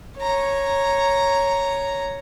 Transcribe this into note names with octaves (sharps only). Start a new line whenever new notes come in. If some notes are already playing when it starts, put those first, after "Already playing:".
C#5 A#5